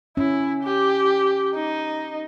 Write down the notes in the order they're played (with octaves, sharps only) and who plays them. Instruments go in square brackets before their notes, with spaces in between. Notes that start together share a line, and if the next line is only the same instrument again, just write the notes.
[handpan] C#4 [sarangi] E4
[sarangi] G4
D#4